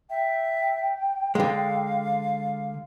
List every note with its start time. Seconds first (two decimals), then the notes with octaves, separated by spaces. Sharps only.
0.10 E5 G5
1.35 D3 G#3 F5